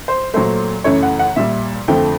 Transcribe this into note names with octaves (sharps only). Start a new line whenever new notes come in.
C5
A#2 F#3 A3 C5
F#2 C#3 E3 A3 C#5
F#5
F#5
A#2 G3 E5
F2 D3 F3 A3 G5